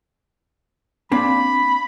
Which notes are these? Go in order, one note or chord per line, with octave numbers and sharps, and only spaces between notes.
A#3 C4 D4 B5